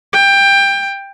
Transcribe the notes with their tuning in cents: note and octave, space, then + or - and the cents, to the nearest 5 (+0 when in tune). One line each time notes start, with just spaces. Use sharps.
G5 +20